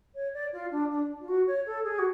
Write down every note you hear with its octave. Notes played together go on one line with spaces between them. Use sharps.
C#5
D5
F4
D4
D4
F4
F#4
C#5
A4
G#4
F#4